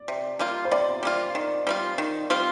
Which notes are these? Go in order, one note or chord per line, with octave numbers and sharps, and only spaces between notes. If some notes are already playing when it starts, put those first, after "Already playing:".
Already playing: D5
C3
G3 A#3 F4
C5
C3 D5
G3 A#3 F4
D#3
G3 C4 F4
D#3
G3 C4 F4